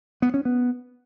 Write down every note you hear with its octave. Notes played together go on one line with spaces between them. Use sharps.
B3
C#4
B3